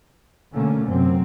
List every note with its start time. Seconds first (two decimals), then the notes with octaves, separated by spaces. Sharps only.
0.52 B2 D3 A3 A#3 C#4
0.86 F#2 C3 C4